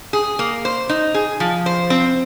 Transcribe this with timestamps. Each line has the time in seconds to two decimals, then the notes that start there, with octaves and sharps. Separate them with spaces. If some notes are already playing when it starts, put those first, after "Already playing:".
0.13 G#4
0.39 A#3
0.65 C5
0.89 D#4
1.14 G#4
1.40 F3
1.66 C5
1.90 C4